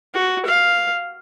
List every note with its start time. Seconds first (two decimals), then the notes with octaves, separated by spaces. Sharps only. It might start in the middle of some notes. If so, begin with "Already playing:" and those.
0.15 F#4
0.46 F5